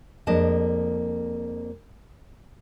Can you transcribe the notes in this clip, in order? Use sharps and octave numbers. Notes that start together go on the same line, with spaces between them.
F2 G#3 A#3 D4 D#5 A5